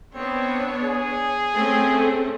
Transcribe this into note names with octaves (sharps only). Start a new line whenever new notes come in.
B3 C4 D4 C#5
G#4
A3 C4 C#4